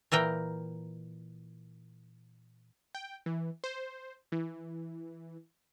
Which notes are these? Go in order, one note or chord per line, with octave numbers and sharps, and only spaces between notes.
A#2 E3 A#4 G5
G5
E3
C5
E3